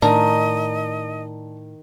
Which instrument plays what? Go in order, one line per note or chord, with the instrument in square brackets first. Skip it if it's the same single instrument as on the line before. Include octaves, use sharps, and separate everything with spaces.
[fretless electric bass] A2 [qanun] D#3 [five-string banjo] D4 A#4 A#5 [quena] D#5